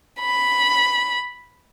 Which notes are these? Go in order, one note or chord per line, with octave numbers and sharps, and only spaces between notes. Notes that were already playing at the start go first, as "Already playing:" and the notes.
B5